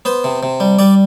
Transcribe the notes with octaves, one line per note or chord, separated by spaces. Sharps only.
B3 C5
C3
C3
G3
G3 D5